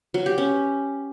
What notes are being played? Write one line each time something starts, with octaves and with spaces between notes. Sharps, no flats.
F#3
G4
C#4